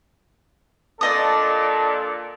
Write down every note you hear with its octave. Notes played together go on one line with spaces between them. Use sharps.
A#2 D4 A4 D5 D#5 D#6